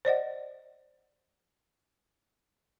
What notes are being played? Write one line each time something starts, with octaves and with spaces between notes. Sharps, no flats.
C5 D5 D#5 F#5